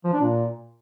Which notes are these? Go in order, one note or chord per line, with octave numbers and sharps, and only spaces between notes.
F3
D4
A#2